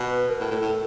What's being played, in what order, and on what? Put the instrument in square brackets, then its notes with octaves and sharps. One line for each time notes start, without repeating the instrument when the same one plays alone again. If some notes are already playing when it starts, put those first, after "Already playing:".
Already playing: [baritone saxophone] B2
[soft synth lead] B4
A#4
[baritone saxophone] A2
[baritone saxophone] A2 [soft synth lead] A4
[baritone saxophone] A2